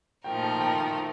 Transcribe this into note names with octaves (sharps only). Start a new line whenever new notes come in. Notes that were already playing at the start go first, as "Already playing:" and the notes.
A#2 F3 A3 D#4 A#4 G5
A5
G5